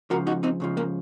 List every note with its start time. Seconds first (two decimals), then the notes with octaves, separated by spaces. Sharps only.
0.10 C#2 C#3 F3 F#4 A#4
0.27 D#4 F#4
0.43 C4 D#4
0.60 C#2 C#3 F3
0.77 A#3